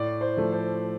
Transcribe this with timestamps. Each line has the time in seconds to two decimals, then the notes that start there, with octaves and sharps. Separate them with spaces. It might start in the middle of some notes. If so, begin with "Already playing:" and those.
Already playing: A2 D5
0.21 C5
0.37 F3 A3
0.52 C5